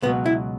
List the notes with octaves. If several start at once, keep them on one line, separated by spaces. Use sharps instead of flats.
C#2 B2 F#3 B3
E4